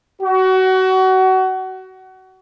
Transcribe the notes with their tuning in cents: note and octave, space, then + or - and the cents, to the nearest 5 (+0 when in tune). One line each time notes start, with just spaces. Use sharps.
F#4 +25